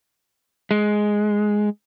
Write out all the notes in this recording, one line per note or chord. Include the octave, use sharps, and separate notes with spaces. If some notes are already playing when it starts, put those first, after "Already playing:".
G#3